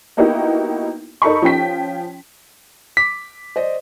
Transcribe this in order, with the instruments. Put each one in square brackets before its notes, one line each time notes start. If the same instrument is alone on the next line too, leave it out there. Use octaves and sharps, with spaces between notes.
[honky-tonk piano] A#3 B3 D#4 E4 F#4 G4
D#4 A4 A#4 B5 C#6
F3 C#4 G5 B6
[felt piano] D6 [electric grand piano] B6
[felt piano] C5 D5 D#5